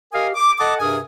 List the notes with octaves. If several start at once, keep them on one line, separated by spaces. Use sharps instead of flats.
G4 A#4 D#5 F5 G#5 D#6
D6
A4 D#5 F#5 A5 D6 D#6
G2 C3 G#4 A#4 G#5 D#6